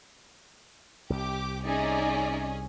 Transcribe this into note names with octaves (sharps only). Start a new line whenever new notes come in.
C2 G4 D6
C#4 D#4 G#4 D5 E5